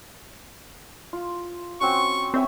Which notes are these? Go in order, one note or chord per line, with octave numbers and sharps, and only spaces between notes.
F4
C4 C#4 F#4 C#6
C4 C#5 E5 G#5